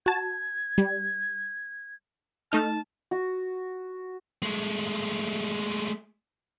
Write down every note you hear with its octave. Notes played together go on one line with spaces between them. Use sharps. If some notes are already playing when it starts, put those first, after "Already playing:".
F#4 A5 G#6
G3
A3 D#4 A5 F6
F#4
G#3 A3